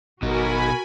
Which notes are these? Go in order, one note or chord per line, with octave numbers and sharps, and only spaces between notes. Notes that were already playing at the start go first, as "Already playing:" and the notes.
G#1 B2 D#4 F#4 A#4 G#5 B5